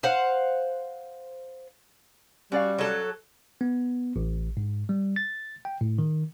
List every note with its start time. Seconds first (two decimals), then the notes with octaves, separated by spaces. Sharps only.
0.03 C5 F5 F#5
2.52 G3 C#4 F#4 D5 F5
2.79 F#3 A4
3.61 B3
4.16 A1
4.57 G#2
4.89 G3
5.16 A6
5.65 G5
5.81 A2
5.99 D#3